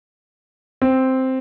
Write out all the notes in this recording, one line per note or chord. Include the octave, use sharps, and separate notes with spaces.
C4